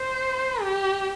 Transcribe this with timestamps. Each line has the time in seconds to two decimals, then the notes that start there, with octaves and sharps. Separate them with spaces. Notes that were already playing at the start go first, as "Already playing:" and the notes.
Already playing: C5
0.61 G4